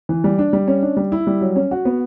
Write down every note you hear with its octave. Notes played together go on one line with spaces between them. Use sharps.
E3
G3
D4
G3
C#4
D4
G3
E4
G3
F#3
C#4
F#4
B3